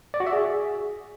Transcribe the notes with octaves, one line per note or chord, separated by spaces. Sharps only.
D5
F#4
E5
G#4